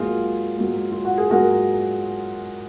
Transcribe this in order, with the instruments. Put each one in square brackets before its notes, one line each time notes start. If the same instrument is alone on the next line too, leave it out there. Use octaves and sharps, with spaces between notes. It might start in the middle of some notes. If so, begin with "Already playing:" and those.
Already playing: [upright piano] G#2 F#3 A#3 F4 G#4
G#2 F#3 A#3
F4
F#4
G#4
G#2 F#3 A#3 F#4 A#4